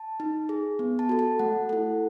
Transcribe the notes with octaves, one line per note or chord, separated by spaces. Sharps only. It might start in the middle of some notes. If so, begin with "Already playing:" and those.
Already playing: A5
D#4
G#4
B3
A5
F#4 A4
A5
A3 F#5
E4 A4